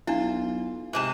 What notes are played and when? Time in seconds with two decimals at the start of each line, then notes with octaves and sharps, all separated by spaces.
0.07 B1 D4 E4 F4
0.93 G#2 C3 A5